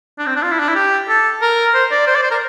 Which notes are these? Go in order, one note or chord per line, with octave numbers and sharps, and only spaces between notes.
D4
C4
D4
F4
E4
D4
E4
G4
A4
A#4
C5
D5
C5
D5
C5
A#4